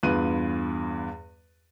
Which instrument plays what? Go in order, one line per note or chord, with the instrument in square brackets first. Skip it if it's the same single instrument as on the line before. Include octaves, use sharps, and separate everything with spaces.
[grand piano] E2 G2 F4 B4 F#6 D#7